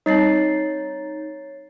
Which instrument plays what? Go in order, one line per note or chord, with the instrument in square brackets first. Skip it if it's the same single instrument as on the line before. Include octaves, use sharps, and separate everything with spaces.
[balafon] G3 C4 [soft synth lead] D#4 [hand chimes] C#5 A6 C7